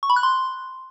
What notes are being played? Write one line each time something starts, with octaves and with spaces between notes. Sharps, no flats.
C#6
B5
F#6
C6